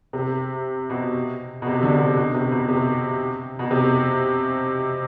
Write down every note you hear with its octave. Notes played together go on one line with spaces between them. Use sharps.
C3
B2
B2
C3
D3
C3
B2
C3
B2
C3
B2
C3